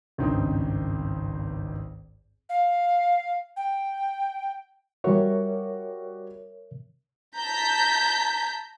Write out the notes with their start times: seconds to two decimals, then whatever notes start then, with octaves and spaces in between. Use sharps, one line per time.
0.18 G#1 C#2 G2 D#3 C4 D#4
2.49 F5
3.56 G5
5.04 G3 F#4 A#4 C#5 E5
7.37 A5 A#5 G6 B6